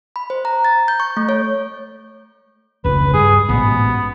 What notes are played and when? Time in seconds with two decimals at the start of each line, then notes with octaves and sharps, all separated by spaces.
0.16 B5
0.30 C5
0.45 A#5
0.65 A6
0.88 G6
1.00 C#6
1.17 A3
1.29 C#5
2.84 F1 C#2 B4
3.13 G2 G#4
3.49 A1 G#2 B2 B3